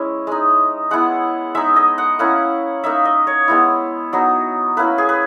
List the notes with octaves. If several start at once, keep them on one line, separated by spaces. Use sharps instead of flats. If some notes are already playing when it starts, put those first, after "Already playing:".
Already playing: G#3 C#4 E4
G#3 D#4
G#3 B3 E4 F#5
G#3 D#4 E5
D#5
F#5
A#3 C#4 E4 F#5
A#3 D#4 E5
D#5
C#5
G#3 B3 E4
F#3 B3 D#4
A#3 C#4 E4 B4
G#4
B4